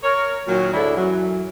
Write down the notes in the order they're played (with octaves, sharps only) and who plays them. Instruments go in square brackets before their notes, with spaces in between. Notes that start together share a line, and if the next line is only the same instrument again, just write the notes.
[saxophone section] A#4 C#5
A#2 D#3 F#3
D2 G#2 D4 E4 A4
F#2 E3 F#3